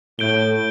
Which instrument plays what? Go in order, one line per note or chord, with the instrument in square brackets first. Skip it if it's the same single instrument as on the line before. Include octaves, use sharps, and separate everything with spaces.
[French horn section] A2 [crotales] G6 D7 G7